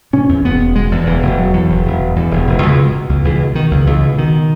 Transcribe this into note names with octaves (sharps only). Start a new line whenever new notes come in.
B2 C#4
E2
E1 B3
E1
B2 G#3
E2
E1 E3
E1
B2 F#3
E2
E1
E1
B2
E2
E1
E1
C#2 G#3
B2
B2
C#2
C#2 E3
B2
B2 D#3
C#2
C#2 E3
B2
B2 D#3